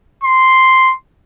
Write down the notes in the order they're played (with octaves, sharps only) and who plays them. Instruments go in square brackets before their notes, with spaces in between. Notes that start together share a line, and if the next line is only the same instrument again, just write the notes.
[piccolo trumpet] C6